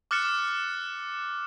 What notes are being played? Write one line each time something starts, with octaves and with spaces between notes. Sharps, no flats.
D6 F6 F#6 A6 C#7 E7